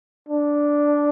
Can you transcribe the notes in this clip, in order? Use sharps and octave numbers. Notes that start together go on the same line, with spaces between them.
D4